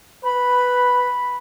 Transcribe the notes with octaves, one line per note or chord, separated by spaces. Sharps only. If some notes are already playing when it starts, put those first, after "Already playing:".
B4 B5